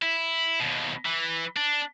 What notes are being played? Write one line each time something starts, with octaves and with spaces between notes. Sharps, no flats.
E4
D#2 B2
E3
D4